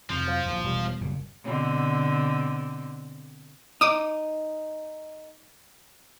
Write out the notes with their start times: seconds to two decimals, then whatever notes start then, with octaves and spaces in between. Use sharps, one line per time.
0.10 F2 C3 F3
0.27 F#3 C5 F5
0.46 A#1 D#2
0.64 E1 B2 G3
1.01 F#1 F#2 A#2
1.44 B2 D3 C4
3.81 D#4 D6 D#6